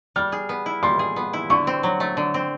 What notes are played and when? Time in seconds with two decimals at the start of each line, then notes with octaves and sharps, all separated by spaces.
0.16 G3 F6
0.32 G#4
0.49 B3
0.66 E4
0.83 G3 C6
0.99 G#4
1.16 B3
1.33 E4
1.50 D3 C#6
1.67 C4
1.83 F#3
2.00 A3
2.17 D3
2.34 C4